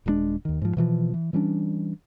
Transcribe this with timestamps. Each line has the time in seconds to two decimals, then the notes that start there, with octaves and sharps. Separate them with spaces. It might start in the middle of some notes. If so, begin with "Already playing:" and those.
0.06 D#1 G2 G#3 D4
0.45 D#2 D#3
0.62 G#2 F3
0.77 B2 E3 F3
1.14 E3
1.33 E3 G3 C#4 D4